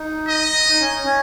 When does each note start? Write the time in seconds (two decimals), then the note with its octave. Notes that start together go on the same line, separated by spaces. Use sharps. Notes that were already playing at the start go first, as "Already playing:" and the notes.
Already playing: D#4
0.29 D#5
0.69 D#4
0.80 C#4
1.04 C#4